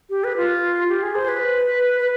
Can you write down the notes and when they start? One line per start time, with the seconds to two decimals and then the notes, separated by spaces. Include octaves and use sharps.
0.10 G4
0.24 B4
0.37 F4
0.89 G4
1.02 G#4
1.15 C5
1.28 B4
2.00 B4